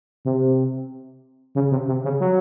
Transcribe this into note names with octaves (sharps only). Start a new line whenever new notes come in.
C3
C#3
C3
C3
C#3
F#3